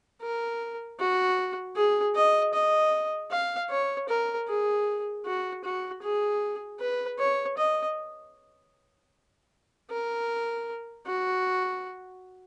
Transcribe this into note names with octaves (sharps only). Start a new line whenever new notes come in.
A#4
F#4
G#4
D#5
D#5
F5
C#5
A#4
G#4
F#4
F#4
G#4
B4
C#5
D#5
A#4
F#4